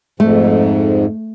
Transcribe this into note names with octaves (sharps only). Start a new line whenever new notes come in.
F2 G#2 A3